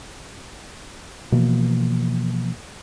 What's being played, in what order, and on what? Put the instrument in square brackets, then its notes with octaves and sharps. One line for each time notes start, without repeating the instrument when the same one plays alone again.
[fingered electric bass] B2 E3 F3 A#3